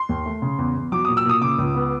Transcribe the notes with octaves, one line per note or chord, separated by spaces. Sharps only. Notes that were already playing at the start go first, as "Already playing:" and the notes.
Already playing: C6
D#2
A3
C#3
E2
E2
F#3 D6
A#2 D#6
E6
A#2 D#6
C#3 D6
C#2
B3